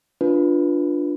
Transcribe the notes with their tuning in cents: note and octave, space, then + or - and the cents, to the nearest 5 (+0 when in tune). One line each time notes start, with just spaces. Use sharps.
D4 +0 F4 +0 B4 -10